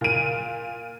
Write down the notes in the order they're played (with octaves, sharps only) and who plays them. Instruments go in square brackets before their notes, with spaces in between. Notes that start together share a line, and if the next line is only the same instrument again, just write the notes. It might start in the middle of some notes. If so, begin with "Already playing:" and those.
[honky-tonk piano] A#2 D#7